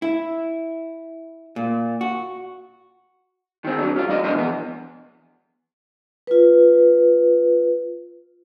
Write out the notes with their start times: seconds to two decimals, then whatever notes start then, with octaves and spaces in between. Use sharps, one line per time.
0.02 E4
1.56 A#2
2.01 F#4
3.65 D#3 C4
3.79 F#3 D4
3.96 C#4 F4
4.09 F#3 D5 D#5
4.24 C2 B2 F3 D4 D#5 E5
4.35 E3 B3
6.27 F4 B4